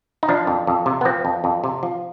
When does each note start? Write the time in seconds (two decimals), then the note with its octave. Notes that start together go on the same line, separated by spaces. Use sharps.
0.23 D#4
0.29 F3 D4
0.47 F2
0.67 F2
0.86 C3
1.01 B3
1.05 F3 C4
1.25 F2
1.44 F2
1.64 C3
1.83 F3